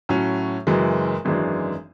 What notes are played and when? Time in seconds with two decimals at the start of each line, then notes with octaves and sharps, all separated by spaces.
0.09 A2 F#3 C#4
0.67 F#1 F#2 E3 G#3
1.25 G#1 F#2 E3 G#3 D4